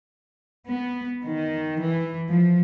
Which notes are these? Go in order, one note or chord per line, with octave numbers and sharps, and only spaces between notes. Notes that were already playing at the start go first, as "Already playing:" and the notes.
B3
D#3
E3
F3